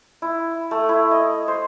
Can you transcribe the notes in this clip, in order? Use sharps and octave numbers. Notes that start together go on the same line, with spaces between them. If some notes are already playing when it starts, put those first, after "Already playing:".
E4
A3
E4
D#5
C5